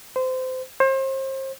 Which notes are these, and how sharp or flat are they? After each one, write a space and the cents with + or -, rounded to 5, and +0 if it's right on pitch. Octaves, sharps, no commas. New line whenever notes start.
C5 -25
C5 +35